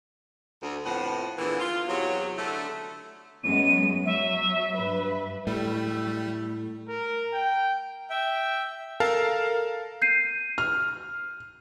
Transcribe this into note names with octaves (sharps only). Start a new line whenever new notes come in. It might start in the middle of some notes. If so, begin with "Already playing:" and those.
D2
F2 A2 F3 B3 F#5
E2 A#2 D3 E3
F4
E2 C3 F#3
D3 A3
F#2 G#3 B3 D#7
F#3 E5
G2 B4
A2 G3 A3
A#4
G5
E5 G5
A4 A#4 F5 A5
G6 C7 D#7
F6